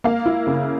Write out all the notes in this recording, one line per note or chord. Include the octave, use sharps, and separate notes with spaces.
A#3 F5
E4
C#3